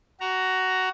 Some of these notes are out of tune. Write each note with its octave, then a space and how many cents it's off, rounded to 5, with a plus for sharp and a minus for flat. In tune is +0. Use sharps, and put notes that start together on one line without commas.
F#4 +15 A#5 +0